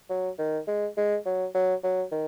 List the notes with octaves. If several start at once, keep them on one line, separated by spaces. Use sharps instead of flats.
F#3
D#3
G#3
G#3
F#3
F#3
F#3
D#3